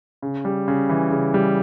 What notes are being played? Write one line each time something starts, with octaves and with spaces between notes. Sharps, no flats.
C#3
G3
C#3
E3
C#3
G3